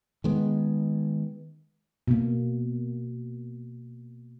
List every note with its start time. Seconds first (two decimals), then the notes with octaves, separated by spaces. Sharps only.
0.24 D#3 G#3 B3
2.08 B2 A#3